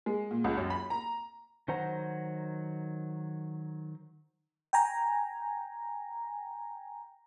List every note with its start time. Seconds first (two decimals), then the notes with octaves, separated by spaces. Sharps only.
0.06 G#3
0.31 A#2
0.44 C#2
0.57 F#2
0.70 B5
0.90 A#5
1.68 D#3 F#3 C5 F#5 A#5
4.73 G5 G#5 A#5